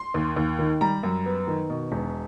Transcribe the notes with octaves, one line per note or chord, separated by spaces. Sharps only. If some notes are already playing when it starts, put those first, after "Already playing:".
Already playing: C6
D#2
D#2
D#3
G3 A#5
F#2
B3
D#3
B2
E1